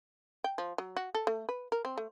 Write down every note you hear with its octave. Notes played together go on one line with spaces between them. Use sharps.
G5
F3
F#3
F#4
A4
A3
B4
A#4
C4
A3